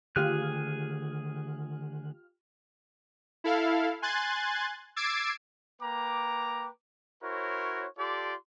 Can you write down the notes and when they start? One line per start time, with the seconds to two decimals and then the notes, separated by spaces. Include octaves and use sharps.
0.16 D3 D#3 A3 F4 G4 G#4 F6 F#6
3.44 E4 A4 F5
4.02 G#5 C6 F#6 G#6 A6
4.96 D6 E6 G#6 A6 C7 D7
5.82 A#3 B4 G5 A#5 D6
7.23 E4 F#4 A#4 C5 C#5
7.98 F4 G4 A4 D5 C6 D6